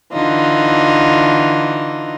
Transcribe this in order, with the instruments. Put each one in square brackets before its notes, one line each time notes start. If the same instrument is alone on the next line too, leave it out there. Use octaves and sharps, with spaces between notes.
[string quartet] D3 E3 D#4 F4